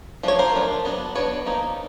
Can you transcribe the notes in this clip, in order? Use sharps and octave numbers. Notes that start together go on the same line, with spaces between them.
F3 A3 D4 C#5
A#4 C5
F3 A3 D4
F#3 B3 D4
F#3 B3 D4 B4 C#5
F3 A#3 D#4